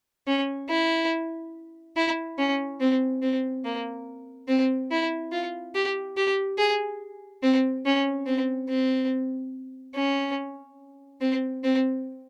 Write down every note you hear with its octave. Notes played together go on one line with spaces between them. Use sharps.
C#4
E4
E4
C#4
C4
C4
A#3
C4
E4
F4
G4
G4
G#4
C4
C#4
C4
C4
C#4
C4
C4